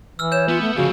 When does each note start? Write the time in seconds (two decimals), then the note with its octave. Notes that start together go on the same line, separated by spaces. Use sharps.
0.19 E3 E6 F6
0.32 C#5 G6 E7
0.49 B3 F4
0.61 A3
0.76 D2 C#3 F3 F#4